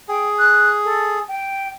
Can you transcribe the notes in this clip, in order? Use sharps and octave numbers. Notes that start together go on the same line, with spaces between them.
G#4 G5
F#6
A4
G5